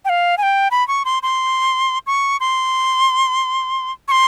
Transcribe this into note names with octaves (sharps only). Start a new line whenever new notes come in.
G5
F5
G#5
G5
B5
C#6
C6
C6
C#6
C6
C#6
C6